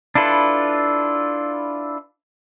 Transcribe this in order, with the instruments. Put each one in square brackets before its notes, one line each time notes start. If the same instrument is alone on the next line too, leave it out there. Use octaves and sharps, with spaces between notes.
[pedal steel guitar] D4 E4 F4 A4 B4